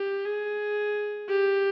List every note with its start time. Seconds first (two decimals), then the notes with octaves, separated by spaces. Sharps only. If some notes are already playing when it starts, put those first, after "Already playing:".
Already playing: G4
0.25 G#4
1.29 G4